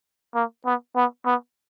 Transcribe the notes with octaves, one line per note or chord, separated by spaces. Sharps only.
A#3
B3
B3
B3